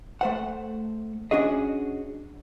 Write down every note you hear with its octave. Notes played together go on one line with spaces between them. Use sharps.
A3 C5 F#5
C#4 D4 F#4 G#4 D#5